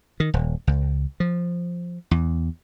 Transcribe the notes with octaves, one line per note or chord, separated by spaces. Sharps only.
D#3
D#1
C#2
F3
E2